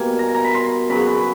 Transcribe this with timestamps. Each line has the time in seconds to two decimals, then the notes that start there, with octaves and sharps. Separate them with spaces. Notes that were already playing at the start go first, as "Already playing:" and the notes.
Already playing: B2 G3 A#3 G#5
0.19 A#5
0.35 A#5
0.44 B5
0.55 C6
0.89 C#3 F#3 B3 B5
1.07 B5